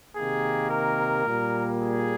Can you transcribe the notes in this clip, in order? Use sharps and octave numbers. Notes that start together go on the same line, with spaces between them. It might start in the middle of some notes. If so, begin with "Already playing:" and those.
C3 D#3 A#3 G#4
A#4
A#2 G3 A#3
G#4